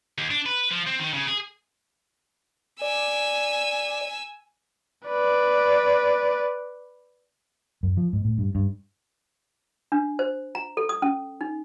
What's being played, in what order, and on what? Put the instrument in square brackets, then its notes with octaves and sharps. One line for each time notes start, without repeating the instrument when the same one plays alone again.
[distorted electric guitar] D#2
D4
B4
F3
C4
D#3
C#3
G#4
[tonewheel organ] D5 [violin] G#5 E6
[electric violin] B4 D5
[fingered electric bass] F#2
F3
G#2
A2
G2
G2
[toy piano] D4
C5
A#5
A4
D#6
C#4
D#4